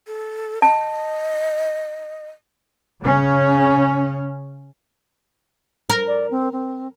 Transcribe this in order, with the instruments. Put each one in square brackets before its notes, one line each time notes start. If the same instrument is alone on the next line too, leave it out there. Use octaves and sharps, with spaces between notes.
[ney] A4
[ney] D#5 [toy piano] A5
[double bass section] C#3 C#4
[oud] A#4
[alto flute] D5
C4
C4